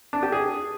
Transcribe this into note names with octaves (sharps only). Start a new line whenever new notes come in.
D4
G4
G#4